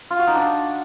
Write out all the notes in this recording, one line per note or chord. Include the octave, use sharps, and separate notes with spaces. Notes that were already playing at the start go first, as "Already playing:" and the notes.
F4
F#4
D#4
D4